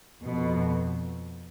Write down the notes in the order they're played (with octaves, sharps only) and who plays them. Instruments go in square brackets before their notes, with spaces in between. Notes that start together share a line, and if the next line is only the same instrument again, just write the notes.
[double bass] F2 [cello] B2